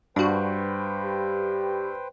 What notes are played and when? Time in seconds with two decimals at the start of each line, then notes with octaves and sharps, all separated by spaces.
0.16 G2 D4 F#4 B4 C5 G5
1.03 G4